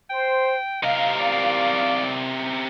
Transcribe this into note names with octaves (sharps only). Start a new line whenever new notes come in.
C5 G5
C3 A#4 D#5 F5
D5